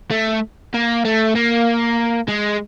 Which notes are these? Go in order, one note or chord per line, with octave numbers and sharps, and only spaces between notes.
A3
A#3
A3
A#3
G#3